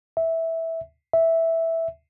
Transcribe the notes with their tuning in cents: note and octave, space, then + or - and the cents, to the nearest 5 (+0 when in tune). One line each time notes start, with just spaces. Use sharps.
E5 -10
E5 -5